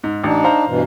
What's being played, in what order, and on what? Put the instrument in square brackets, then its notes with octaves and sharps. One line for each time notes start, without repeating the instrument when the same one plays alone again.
[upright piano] G#2
[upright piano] A1 [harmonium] D4 D#4
[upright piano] C5 F5 A#5
[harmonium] G2 B2 E3